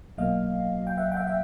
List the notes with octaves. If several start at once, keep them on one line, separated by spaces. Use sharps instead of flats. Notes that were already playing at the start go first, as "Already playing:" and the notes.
B1 B2 F#3 A#3 D#5 F5
G5
E5 F#5
G5
E5 F#5
E5